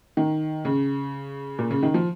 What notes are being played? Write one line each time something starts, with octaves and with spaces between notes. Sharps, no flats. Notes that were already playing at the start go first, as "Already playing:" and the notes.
D#3
C#3
A#2
C#3
D#3
F3